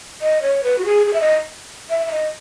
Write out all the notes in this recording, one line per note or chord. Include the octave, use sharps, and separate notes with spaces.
D#5
C#5
B4
F#4
G#4
G#4
E5
D#5
E5
E5
D#5